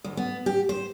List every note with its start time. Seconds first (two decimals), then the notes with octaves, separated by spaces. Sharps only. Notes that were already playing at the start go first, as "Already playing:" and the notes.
0.04 D2
0.17 B3
0.46 G4
0.69 C5